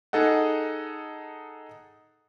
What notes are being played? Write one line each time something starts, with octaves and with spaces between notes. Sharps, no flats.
D#4 G#4 A4 D#5 F#5